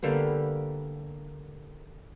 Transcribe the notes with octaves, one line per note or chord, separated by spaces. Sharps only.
D3 G3 A#3 B3